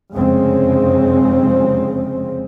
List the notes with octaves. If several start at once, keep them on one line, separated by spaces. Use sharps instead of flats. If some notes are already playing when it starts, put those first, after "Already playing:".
F1 F#2 C#3 G#3 C4